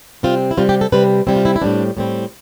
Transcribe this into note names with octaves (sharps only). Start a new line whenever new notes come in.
C3 G3 C4 F4
E4
C3 G3 C4 F4
G4
A4
C3 G3 C4 B4
C3 G3 C4 E4
F4
E4
E4
A2 G3 C4 D4
A2 G3 C4